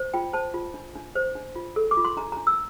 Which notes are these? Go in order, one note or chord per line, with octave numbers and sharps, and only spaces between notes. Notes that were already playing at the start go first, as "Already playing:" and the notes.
Already playing: C5
F4 G5
C5 A5
F4
D4
D4
C5
D4
F4
A4
D6
F4
C6
D4 A#5
A#5
D4
E6